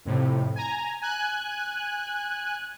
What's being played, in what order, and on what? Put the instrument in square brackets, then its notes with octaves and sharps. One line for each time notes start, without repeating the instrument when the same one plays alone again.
[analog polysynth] F2 A2 C3
G#5 A#5
G#5 F#6